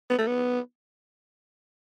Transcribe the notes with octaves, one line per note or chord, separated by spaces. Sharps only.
B3
A3
B3